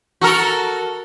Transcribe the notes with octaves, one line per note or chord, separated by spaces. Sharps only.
F#4 A4 A#4